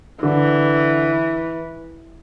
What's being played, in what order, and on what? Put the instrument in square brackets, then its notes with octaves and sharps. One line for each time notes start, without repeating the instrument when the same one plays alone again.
[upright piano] D3 [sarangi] E3